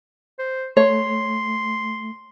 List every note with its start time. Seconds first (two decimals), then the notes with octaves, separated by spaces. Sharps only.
0.38 C5
0.77 A3 C#5 C6